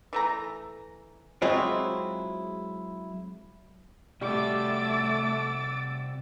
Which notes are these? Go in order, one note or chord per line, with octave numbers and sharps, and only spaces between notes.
E3 A3 A#5
F#3 G#3 C4 E4 F4
C3 G3 A3 F#4 D6 E6 A6